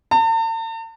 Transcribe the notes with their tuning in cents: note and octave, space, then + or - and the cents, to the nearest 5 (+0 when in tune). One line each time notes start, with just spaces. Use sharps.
A5 +45